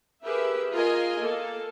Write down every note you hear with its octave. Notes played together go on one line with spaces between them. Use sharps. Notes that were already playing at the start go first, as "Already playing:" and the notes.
G4 G#4 A#4 B4 E5
F4 G#4 A#4 D#5 G#5
A#3 A4